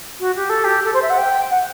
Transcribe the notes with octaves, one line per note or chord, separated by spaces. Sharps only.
F#4
G4
A4
G4
A4
C5
E5
F#5
G5
F#5